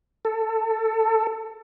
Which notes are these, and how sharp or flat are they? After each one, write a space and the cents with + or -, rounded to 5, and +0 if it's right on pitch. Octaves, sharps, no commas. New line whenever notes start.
A4 +15